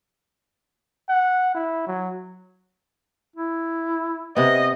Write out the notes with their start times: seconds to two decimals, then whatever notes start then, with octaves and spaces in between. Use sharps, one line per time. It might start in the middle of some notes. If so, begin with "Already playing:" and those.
1.09 F#5
1.55 E4
1.87 F#3
3.36 E4
4.37 C3 B3 D#5